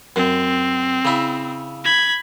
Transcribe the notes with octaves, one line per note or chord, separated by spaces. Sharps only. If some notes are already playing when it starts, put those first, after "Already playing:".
F#2 C4
C#3 E4
B5 G#6